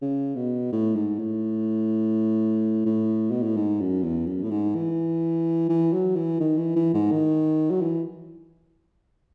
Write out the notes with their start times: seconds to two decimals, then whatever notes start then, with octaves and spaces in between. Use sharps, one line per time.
0.02 C#3
0.36 B2
0.72 A2
0.95 G#2
1.19 A2
2.86 A2
3.31 B2
3.43 A2
3.57 G#2
3.80 F#2
4.03 E2
4.27 F#2
4.43 A2
4.51 G#2
4.75 E3
5.69 E3
5.93 F#3
6.16 E3
6.40 D#3
6.58 E3
6.76 E3
6.94 G#2
7.11 D#3
7.71 F#3
7.81 E3